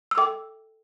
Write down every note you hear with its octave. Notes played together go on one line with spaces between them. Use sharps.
E6
A4 E5 G5 D6